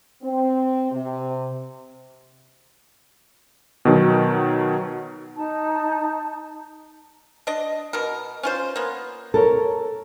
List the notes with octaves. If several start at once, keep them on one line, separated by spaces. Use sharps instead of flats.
C4
C3
B2 D#3 F#3
D#4 A5
D4 D#5
B2 A#4
C#4 F4 C5
A#3 B3
A4 A#4 C#5